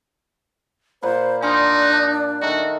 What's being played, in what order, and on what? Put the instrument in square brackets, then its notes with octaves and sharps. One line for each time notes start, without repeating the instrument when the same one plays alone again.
[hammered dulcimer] A#2 F#5 B5 [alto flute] C5
[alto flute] D4 [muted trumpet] D#4 [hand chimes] G#5 C6 F6
[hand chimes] F#6
[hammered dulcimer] D#3 A3 [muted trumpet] F#4